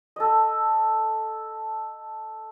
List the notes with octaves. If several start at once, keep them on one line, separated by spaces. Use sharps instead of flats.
A4 D#5